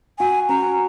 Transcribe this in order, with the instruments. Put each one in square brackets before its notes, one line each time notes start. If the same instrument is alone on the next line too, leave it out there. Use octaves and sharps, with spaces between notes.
[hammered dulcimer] F#4 [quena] G#5
[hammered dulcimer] C#4 [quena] A#5